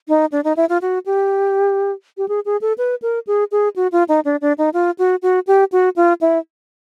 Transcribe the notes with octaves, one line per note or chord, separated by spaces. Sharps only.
D#4
D4
D#4
E4
F4
F#4
G4
G4
G#4
G#4
A4
B4
A#4
G#4
G#4
F#4
F4
D#4
D4
D4
D#4
F4
F#4
F#4
G4
F#4
F4
E4